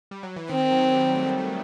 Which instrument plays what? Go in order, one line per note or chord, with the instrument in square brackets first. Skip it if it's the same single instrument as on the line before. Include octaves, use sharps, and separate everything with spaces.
[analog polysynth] G3
F#3
E3
[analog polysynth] D#3 [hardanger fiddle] C4
[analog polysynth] F#3
G3
G3
A3
A3